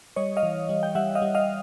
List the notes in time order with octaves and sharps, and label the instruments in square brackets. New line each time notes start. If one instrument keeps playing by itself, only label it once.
[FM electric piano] G3 C#5 D#5
D#5 F5
E3
G3
G5
G3 E5 F#5
D#5 F5
G3
D#5 F5